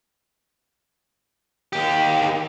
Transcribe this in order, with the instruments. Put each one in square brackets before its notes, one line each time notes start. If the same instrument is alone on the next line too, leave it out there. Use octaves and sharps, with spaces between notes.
[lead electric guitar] D#2 G4